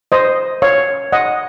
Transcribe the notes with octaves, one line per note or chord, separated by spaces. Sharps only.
C5 D#5
C#5 F5
D#5 F#5